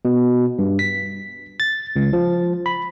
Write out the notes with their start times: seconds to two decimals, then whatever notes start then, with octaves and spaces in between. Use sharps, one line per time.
0.05 B2
0.59 G2
0.79 B6
1.60 A6
1.96 C#2
2.13 F3
2.66 B5